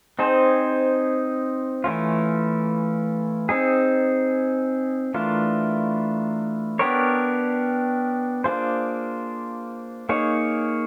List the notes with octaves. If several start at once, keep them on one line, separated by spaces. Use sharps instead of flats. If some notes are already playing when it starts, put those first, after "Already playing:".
C4 D#4 G#4 C5
E3 A3 C#4 F4
C4 D#4 G#4
E3 A3 D4 F4 A#4
B3 D4 G4 A#4 C#5
A#3 D4 F4 G#4 C5
A#3 D#4 G#4 C#5